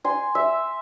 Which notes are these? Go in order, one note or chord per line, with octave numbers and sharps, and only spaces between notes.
G#5 C6
E5